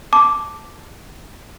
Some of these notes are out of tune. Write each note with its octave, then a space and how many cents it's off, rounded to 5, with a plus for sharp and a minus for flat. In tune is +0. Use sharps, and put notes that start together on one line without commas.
A5 +0 D6 +0